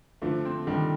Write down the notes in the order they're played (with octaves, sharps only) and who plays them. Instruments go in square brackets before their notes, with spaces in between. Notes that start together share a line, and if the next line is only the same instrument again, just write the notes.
[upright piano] D3 [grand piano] F3 A3
[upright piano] C4
[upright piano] D3 [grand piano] D#3 G3